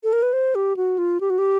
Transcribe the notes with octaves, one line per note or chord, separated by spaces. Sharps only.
A4
A#4
B4
C5
G4
F#4
F4
G4
F#4
G4